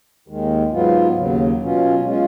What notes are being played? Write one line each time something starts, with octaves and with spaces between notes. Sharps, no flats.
D#2 D#3 G#3
G#2 F#3 B3 F4
D#2 C#3 F#3
B2 F#3 C#4 F4
G#3 C#4 F4